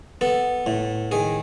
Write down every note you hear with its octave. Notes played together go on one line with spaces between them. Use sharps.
B3 A4
A2
D#3 G#4